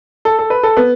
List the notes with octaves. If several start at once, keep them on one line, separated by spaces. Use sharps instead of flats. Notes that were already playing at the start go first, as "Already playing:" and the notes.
A4
A4
B4
A4
B3